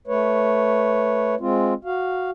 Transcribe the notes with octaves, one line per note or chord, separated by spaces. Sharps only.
A3 B4 C#5
G#3 C4 F4
F#4 F5